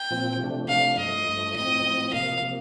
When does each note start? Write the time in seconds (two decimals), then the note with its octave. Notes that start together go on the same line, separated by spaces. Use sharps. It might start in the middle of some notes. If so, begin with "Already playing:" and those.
Already playing: G5
0.11 A#2 F3 C4
0.40 C3 F3 A3 D4
0.68 C3 F3 A3 D4 F5
0.98 G2 F3 A3 D#5
1.27 G2 F3 A3
1.55 A2 F3 C4 D#5
1.85 A2 F3 C4
2.13 C3 F3 A#3 F5
2.42 C3 F3 A#3